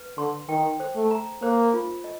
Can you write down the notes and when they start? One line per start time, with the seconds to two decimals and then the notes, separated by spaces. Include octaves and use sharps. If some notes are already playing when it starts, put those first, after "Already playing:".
Already playing: B4
0.18 D3 C6
0.49 D#3 G5
0.80 C5
0.96 A3
1.11 A#5
1.42 A#3 C5
1.74 F4
2.04 D#5